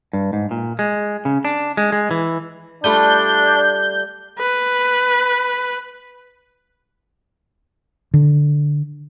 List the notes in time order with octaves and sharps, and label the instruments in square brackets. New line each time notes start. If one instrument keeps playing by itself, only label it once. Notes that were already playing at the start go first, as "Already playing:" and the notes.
[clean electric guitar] G2
G#2
A#2
G#3
C#3
D4
G#3
G#3
E3
[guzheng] G3 A3 F4 [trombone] D4 [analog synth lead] G6
[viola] B4
[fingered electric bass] D3